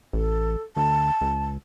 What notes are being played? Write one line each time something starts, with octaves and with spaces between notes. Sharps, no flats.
A1 A4
D2 A5
C#2